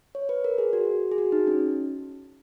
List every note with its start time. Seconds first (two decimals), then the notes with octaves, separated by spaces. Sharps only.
0.15 C#5
0.29 B4
0.44 A#4
0.58 G#4
0.73 F#4
1.12 G#4
1.18 F#4
1.32 D#4
1.47 C#4